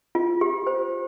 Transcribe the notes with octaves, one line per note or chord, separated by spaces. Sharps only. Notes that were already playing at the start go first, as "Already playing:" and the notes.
F4
G4
C5